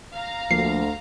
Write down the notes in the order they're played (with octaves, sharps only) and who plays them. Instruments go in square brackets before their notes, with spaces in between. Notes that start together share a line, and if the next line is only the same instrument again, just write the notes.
[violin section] F5 A#5
[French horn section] D2 [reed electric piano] F3 A3 A#3 [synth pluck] C7